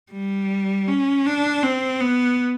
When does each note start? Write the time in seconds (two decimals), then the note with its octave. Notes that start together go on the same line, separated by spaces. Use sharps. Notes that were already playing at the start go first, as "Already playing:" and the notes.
0.13 G3
0.88 C#4
1.26 D4
1.63 C4
2.00 B3